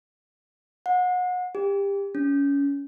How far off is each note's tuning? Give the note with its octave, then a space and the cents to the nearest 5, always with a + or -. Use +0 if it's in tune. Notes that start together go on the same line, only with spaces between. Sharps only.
F#5 -30
G4 +25
C#4 +25